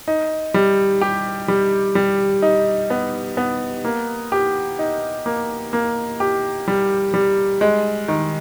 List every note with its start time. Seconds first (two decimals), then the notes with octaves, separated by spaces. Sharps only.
0.08 D#4
0.54 G3
1.01 G4
1.48 G3
1.95 G3
2.42 D#4
2.90 B3
3.37 B3
3.85 A#3
4.32 G4
4.79 D#4
5.26 A#3
5.73 A#3
6.20 G4
6.68 G3
7.14 G3
7.61 G#3
8.08 D#3